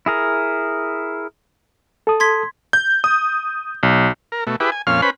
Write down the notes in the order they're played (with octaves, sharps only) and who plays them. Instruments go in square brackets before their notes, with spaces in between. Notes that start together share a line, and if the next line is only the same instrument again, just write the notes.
[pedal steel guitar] E4 G#4 A#4
[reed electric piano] A4 A5 D#6
[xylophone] C6 G#6 B6
[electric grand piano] G6
D#6
B1
[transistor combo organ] A#4
B2 A3
E4 G4 G#4 B4
G#5
F2 A#2 C#4 F5 F6
C#4 B4 C5 B5